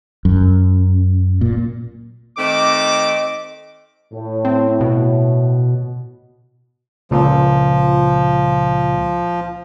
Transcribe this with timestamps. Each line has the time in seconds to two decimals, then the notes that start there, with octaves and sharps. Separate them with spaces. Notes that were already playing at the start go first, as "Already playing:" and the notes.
0.25 F#2
1.41 A#2
2.38 D#3 A3 C4 D#5 D6
4.12 A2
4.45 C4
4.81 B2
7.11 C#2 A#2 F3